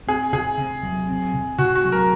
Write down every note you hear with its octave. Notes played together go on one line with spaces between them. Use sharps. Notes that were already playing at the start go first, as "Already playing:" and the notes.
C4 G#4
C3 G#4
C3
F#3
C4
C3
C3 F#4
F#4
F#3
A#4